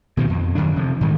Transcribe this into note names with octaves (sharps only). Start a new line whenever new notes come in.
B2 D#3 F3
F2
F#2 D#3 D4
C3 F3
G#2 D#3 E3 G3